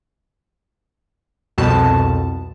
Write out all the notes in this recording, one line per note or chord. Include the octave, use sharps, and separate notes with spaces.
C2 F2 B2 A5